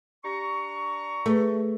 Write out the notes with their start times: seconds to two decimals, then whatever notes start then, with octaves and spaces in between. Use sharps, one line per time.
0.24 D4 G4 A#5 C#6
1.26 A3 G#4 B4